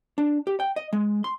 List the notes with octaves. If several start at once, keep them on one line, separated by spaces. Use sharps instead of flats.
D4
G4
G5
D#5
G#3
C6